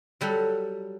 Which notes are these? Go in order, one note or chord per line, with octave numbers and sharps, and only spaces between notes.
F#3 G3 A4 F#5